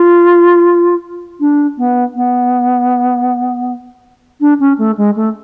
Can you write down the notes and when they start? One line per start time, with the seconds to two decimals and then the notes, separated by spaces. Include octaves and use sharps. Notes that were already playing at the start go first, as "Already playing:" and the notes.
Already playing: F4
1.40 D4
1.77 B3
2.15 B3
4.40 D4
4.60 C#4
4.78 A3
4.97 G#3
5.16 A3